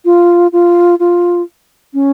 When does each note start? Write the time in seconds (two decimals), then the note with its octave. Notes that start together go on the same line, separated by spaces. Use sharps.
0.05 F4
0.52 F4
0.99 F4
1.94 C#4